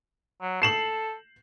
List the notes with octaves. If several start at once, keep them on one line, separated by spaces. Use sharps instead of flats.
F#3
A4 C7 E7 F#7